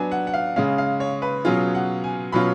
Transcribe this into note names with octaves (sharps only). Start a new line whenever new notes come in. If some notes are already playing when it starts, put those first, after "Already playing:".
Already playing: F#3 B3 D4 G#5
F#5
F#5
F5
C#3 G#3 C#4 F5
F5
C#5
B4
B2 F#3 C#4 F4 G#4
F#5
G#5
B2 F#3 C#4 F4 B5